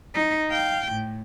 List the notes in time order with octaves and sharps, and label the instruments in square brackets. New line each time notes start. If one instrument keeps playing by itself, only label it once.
[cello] D#4
F5 G5
A2